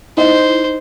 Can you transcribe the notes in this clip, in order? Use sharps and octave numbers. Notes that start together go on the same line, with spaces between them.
D#4 E4 C5 D#5